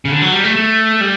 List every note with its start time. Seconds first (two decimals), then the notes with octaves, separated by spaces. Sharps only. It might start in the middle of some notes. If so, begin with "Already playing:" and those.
0.05 C#3
0.10 D3
0.22 F#3
0.33 G3
0.44 A3
0.56 A3
1.01 G3